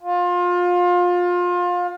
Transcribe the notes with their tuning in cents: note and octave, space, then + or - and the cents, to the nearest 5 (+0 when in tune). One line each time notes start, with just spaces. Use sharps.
F4 +25